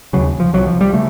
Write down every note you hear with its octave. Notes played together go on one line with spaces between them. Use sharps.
D#2 C#3 F#3
F3
C2 C3 F#3
F3
G3
C#3 A3